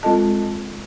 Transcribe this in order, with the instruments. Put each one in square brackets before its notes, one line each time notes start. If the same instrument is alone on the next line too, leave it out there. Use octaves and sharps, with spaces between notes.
[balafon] G#3 C4 F4 A4 D#5 A5